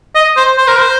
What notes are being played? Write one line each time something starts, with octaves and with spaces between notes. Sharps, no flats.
D#5
C5
C5
A#4
C5